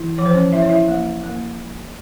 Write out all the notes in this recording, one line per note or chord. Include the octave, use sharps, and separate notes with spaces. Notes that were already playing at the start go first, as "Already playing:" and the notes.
Already playing: E3 E4
F3 C#5
C5
C#4 C#5
E4 E5
C#5
E4 E5
A#3
A#3